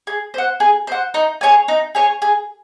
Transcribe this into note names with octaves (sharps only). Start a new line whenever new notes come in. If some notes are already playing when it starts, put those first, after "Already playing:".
G#4
C5 F#5
G#4
C5 F#5
D#4
G#4 C#5 G#5
D#4
G#4 C#5 G#5
G#4